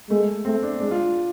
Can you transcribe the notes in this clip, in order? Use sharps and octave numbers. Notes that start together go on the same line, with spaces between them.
G#3 A3
A3 C4
D4
G#3 D4
F4